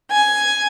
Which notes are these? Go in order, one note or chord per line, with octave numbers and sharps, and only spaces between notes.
G#5